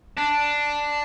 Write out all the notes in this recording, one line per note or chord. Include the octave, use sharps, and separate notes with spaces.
D4